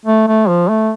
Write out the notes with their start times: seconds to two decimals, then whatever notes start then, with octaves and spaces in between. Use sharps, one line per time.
0.06 A3
0.28 A3
0.49 F3
0.69 A3